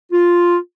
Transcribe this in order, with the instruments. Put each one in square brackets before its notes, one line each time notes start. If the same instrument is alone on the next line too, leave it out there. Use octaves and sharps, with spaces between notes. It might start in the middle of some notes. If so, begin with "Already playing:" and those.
[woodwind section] F4